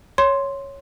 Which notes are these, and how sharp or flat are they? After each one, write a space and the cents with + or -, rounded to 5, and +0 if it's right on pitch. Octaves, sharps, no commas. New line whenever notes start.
C#5 +0 C6 +0